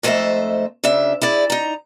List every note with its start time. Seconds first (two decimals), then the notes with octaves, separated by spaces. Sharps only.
0.03 F2 G#2 A3 C5 D#5 E5
0.84 D2 C#3 D4 E5
1.22 E4 G#4 D5
1.50 D#4 A#5